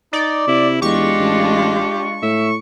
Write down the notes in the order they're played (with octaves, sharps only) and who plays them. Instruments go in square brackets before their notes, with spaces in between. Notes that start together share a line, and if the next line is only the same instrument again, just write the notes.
[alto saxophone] D#4 [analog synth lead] D5
[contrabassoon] C3 [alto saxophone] E4
[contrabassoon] E2 [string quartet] G#3 D4 F4 [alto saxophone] G4 [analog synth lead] C#6
[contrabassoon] A1
[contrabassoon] A2 [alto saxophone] E5